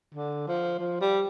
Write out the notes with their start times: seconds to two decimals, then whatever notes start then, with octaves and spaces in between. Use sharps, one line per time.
0.14 D3
0.48 F3
0.79 F3
1.01 G3